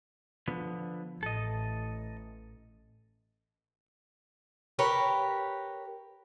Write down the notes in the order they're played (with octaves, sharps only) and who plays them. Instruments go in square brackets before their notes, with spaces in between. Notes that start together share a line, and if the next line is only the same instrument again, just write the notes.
[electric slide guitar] D3 F3 B3
[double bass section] A1 [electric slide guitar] A4 D#5
[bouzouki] G4 A#4 B4 C#5